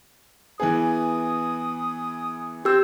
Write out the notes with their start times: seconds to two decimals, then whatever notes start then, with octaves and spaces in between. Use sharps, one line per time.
0.60 E3 B3 G#4 D#6
2.65 C4 G4 E6